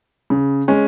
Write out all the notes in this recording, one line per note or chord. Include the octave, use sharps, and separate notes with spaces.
C#3
G#3 C#4